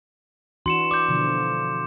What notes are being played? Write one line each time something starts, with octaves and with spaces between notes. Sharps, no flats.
E3 D4 F#4 C6 C#7 E7
D5 D6 G6
B2 D3 F3